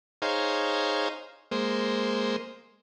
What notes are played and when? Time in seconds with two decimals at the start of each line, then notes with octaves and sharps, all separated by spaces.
0.22 D#4 G#4 C5 C#5 F5 A#5
1.51 G#3 A#3 C5